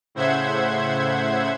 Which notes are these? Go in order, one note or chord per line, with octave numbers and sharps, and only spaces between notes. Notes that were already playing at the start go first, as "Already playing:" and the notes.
A2 C#3 C5 E5 F#5 G#6